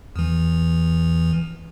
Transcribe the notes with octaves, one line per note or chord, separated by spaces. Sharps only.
E2 E3